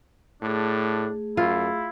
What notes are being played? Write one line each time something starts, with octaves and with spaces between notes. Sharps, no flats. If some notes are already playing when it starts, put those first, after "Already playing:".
A2 A3 D4 G#4
F#2 E4 F4